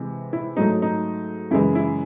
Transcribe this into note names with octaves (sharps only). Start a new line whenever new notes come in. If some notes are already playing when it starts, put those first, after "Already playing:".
Already playing: C3 E3 G#3
E4
G#2 F#3 A3 D#4
D#4
F#2 C#3 E3 G#3 E4
E4